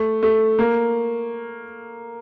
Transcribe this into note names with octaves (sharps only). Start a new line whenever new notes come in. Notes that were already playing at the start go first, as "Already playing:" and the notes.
Already playing: A3
A3
A#3